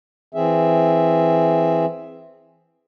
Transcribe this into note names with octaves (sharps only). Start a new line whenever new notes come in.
E3 C4 G#4 E5